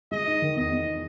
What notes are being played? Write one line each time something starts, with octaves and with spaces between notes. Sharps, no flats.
G#3 D#5
D#4
D#3
E2 D#5
E2
D#4